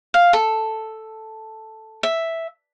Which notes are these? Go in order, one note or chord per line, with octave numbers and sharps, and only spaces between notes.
F5
A4
E5